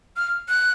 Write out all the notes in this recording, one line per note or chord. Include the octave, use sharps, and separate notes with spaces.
F6
F#6